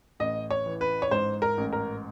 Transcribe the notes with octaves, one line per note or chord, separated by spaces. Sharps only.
A1 D#5
C#5
E3
B4
C#5
G#2 C5
A#4
A1
A#4